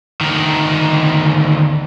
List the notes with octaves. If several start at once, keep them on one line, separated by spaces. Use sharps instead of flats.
D2 D#3